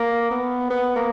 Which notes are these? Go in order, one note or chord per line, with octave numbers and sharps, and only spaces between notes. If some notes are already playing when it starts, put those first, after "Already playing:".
Already playing: A#3
B3
B3
A#3